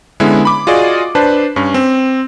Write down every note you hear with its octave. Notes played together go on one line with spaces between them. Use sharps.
D3 G#3 B3 C#4 E4
B5 D6
F4 F#4 G#4 D5 D#5
D4 B4 C5 A5
G2 C#4
C4